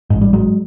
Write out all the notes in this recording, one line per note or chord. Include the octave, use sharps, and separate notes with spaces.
A1 G#2 G#3
G3
F#3 G#3